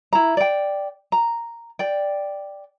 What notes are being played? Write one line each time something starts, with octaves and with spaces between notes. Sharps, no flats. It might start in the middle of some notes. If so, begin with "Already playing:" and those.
E4 A#5
D5 G5
A#5
D5 G5